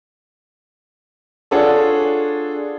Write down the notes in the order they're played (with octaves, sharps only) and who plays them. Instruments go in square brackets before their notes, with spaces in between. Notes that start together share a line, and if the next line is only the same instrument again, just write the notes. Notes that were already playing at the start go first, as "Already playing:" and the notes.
[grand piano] D4 F4 G#4 A4 C#5 F#5